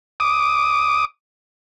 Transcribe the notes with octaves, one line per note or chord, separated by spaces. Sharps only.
D6 D#6